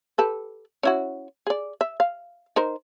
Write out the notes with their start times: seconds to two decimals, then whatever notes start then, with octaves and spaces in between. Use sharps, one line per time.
0.18 G4 A4 B4
0.83 C#4 E4 F#4
1.47 G#4 D5
1.81 E5
2.00 F5
2.56 D#4 A#4 C5